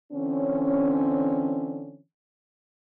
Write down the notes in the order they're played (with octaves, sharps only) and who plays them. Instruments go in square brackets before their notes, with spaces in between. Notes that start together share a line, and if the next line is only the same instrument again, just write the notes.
[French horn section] D3 E3 C4 C#4